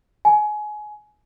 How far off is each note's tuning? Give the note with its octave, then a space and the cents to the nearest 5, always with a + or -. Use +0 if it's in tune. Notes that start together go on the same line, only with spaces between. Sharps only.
G#5 +25